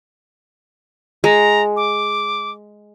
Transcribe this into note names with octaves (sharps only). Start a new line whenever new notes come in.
G#3 A#5
D6